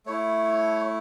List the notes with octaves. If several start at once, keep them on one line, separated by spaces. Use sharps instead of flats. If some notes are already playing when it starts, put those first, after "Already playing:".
A3 E4 C#5